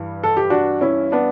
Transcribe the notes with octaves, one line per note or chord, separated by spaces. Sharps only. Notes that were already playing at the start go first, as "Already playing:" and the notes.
Already playing: G2 E3 G3
A4
G4
D4 F#4
C#4 E4
B3 D4